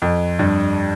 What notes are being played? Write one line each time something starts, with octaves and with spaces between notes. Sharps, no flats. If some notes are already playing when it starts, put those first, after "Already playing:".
F2
G2